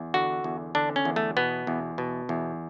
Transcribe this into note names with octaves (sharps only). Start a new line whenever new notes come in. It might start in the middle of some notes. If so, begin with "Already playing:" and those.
Already playing: E2
D3 F#4
E2
D3 D4
C#4
E2
A3
B2 B3
E2
B2
E2